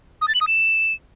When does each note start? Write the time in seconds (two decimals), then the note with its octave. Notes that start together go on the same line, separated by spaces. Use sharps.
0.22 D#6
0.28 A6
0.35 F#7
0.41 D#6
0.48 E7